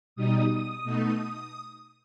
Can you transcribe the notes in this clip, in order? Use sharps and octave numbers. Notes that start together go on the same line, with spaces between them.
B2 G3 D#4 D#6
B2 A3 D#4